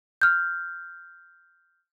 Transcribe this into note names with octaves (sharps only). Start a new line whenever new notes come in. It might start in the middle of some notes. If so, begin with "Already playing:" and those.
F6 G6